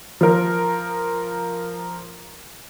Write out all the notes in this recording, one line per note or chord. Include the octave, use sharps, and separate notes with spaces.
F3 A#4